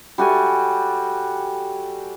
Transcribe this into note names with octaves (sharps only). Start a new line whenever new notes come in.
G3 F#4 A4 G#5